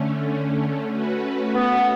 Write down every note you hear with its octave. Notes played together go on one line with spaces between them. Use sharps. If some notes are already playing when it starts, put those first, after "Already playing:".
Already playing: D3 A3 C#4
A3 C#4 F#4 B4
B3